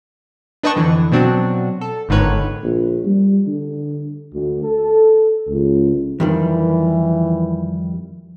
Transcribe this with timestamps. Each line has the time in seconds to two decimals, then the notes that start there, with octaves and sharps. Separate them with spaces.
0.63 D4 B4 D#5 G5 A5 C#6
0.76 F2 D3 E3
1.11 B2 F#3 C4 D4 F#4
1.81 A4
2.09 G1 G#2 D3 D#3 B4 C#5
2.63 A#1
3.05 G3
3.47 D3
4.33 D2
4.63 A4
5.48 C#2
6.20 F2 D#3 E3 G3